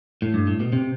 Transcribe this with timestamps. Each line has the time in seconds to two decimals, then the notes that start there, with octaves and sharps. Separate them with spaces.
0.22 A2
0.34 G2
0.47 A2
0.60 B2
0.73 C3